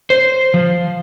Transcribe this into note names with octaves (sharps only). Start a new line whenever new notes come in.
C5
F3